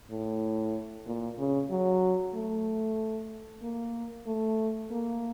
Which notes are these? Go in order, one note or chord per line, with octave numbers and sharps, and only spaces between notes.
A2
A#2
C#3
F#3
A3
A#3
A3
A#3